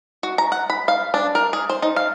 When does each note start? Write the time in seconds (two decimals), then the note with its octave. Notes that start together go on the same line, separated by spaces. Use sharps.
0.23 F#4
0.38 A#5
0.52 F#5
0.70 B5
0.88 F5
1.14 D4
1.35 A#4
1.53 G#4
1.69 C5
1.82 D#4
1.96 F5